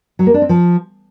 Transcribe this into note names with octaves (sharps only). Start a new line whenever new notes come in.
F#3
A#3
D4
C4
F3